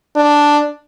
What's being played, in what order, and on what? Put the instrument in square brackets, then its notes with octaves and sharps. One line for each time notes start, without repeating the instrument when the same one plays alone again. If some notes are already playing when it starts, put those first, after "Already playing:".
[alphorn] D4